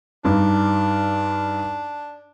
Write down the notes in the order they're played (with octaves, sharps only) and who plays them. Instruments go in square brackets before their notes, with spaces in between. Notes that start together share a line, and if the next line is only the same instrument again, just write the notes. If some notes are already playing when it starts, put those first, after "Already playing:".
[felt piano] G2 D#4 [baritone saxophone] D4